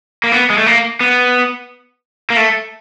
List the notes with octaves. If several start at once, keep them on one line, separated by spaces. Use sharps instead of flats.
A#3
B3
G#3
A3
A#3
B3
A#3
A3